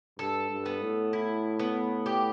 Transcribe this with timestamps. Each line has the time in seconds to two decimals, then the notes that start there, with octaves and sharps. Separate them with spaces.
0.19 G2 A4
0.50 G2
0.66 B3
0.82 A2
1.13 E4
1.59 B3
2.06 G4